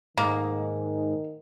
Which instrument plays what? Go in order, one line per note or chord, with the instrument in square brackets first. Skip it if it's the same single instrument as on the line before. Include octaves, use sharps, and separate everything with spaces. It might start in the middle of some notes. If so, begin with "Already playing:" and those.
[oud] G#2 [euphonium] D#3 [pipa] A#3